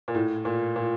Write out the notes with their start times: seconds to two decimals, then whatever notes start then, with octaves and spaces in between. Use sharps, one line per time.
0.08 A#2
0.15 A2
0.45 A#2
0.76 A#2